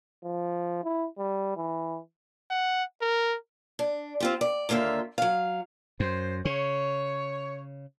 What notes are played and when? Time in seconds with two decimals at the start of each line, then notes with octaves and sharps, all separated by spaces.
0.24 F3
0.84 E4
1.18 G3
1.57 E3
2.50 F#5
3.01 A#4
3.79 D4
4.20 C4 F4 G4
4.41 D5
4.69 D#2 D3 A#3 F4 E5
5.18 F#3 F5
6.00 F#2 C5
6.45 C#3 C#5